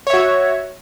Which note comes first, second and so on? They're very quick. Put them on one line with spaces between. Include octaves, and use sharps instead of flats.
C#5 E5 F#4